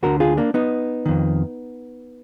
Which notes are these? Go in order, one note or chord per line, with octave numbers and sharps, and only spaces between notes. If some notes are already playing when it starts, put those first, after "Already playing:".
D2 D3 F#4 A#4
F4 G#4
A#3 D4
B3 D#4
F2 D#3